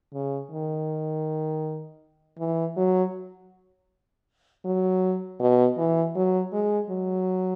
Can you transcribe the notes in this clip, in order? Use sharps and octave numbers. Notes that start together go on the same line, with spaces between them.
C#3
D#3
E3
F#3
F#3
B2
E3
F#3
G#3
F#3